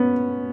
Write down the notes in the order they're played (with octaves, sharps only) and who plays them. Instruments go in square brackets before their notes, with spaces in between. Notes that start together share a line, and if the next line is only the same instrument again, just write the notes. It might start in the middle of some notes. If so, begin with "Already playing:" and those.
Already playing: [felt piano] B3 C#4